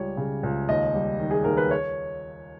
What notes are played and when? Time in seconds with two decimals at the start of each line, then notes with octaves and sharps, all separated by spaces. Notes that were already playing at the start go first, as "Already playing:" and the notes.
Already playing: C#2 G3 C#5
0.17 C#3
0.43 C#2
0.68 D#2 D#5
0.94 G3
1.19 D#3
1.30 G#4
1.44 D#2 A#4
1.57 B4
1.71 C#5